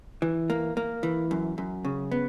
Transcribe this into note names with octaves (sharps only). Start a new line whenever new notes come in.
E3
A#3
A#3
E3
F#2
F#2
C#3
B3